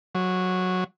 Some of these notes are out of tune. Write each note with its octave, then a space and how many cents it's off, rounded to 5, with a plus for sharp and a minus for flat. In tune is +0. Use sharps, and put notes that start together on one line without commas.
F#3 -10